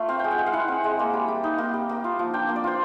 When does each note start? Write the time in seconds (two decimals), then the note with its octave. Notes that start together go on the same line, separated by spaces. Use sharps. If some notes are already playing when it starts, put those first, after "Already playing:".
Already playing: A3 F4
0.08 C4 F5
0.19 G#3 G5
0.31 F#5
0.38 G#3
0.46 F5
0.53 E4 F#5
0.68 C4
0.84 G#3
0.99 A#3
1.13 G3
1.28 G3
1.44 D#4
1.58 A#3
1.74 G3
1.89 A#3
2.04 F4
2.19 F3
2.34 D4 G5
2.49 A#3
2.56 D5
2.64 F4 C5